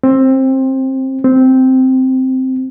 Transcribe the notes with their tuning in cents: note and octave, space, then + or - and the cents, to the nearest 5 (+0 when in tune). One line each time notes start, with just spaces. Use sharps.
C4 +20
C4 -5